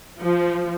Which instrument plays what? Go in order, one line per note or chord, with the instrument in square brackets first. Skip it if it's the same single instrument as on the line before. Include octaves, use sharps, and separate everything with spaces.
[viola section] F3